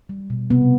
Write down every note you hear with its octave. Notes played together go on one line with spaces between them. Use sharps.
G3
B2
C3 B3